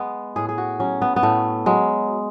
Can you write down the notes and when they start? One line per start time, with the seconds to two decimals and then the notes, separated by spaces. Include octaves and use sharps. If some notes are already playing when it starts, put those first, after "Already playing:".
Already playing: G#3 B3
0.36 A2 G#4
0.49 G#4
0.58 F#4
0.80 F#3 C#4
1.02 B3
1.16 B3
1.23 A2 A3
1.66 F#3 G#3